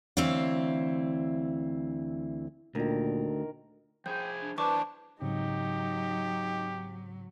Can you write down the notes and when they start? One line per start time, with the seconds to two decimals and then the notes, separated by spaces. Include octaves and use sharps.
0.17 D2 E3 C4 E4 C#5 F5
2.75 D2 A#2 D#3 A#4
4.06 F3 G#4 G5 G6
4.40 D4
4.58 E3 D4 B4 C5 D5 A5 C#6 D6
5.21 G#2 C#3 F#3 C4 D#4 G4